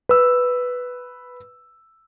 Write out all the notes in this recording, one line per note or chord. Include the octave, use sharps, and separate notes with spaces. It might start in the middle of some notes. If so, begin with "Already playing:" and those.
B4 E6